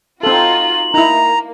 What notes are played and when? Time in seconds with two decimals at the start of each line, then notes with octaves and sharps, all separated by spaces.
0.23 C4 D#4 F4 F#4 A4 F#7
0.94 A#3 D#4 E4 A#5